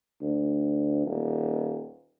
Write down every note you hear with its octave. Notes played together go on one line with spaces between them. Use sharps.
D2
D#1